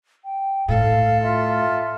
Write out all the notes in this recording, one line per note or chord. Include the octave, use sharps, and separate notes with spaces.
G5
A2 A4 F5
F4 E5